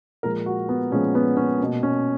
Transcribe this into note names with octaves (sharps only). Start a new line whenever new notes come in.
A#2 F3 G#3 A#4
F#4
B3
A#2 F3 G#3 C#4
B3
C#4
B2 A#3
C#4